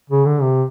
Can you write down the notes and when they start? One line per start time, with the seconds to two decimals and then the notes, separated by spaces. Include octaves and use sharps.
0.10 C#3
0.25 D3
0.42 C3